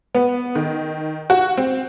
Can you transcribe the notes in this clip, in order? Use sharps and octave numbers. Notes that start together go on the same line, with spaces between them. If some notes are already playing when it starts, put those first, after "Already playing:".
B3
D#3
F#4
C4